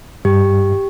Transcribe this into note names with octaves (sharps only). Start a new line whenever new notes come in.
G2 G4